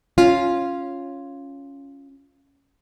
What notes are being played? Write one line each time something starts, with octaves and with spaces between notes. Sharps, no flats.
C#4 F4